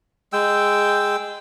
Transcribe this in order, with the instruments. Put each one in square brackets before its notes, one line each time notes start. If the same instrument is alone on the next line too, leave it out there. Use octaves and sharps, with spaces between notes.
[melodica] G#3 G5 E6